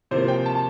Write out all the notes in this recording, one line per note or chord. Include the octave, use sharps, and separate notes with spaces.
C3 F3 A#3 C5
G5
A5